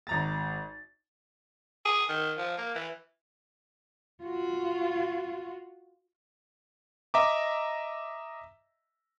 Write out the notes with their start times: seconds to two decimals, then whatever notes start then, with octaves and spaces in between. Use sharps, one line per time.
0.07 G#1 A#5 A6
1.86 G#4
2.09 D#3
2.37 F3
2.58 A#3
2.75 E3
4.23 F4 F#4
7.14 D#5 E5 A#5 D6